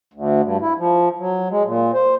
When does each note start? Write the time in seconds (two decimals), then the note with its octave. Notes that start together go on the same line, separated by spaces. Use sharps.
0.14 D2
0.42 G2
0.61 E4
0.78 F3
1.19 F#3
1.51 G#3
1.65 A#2
1.94 C5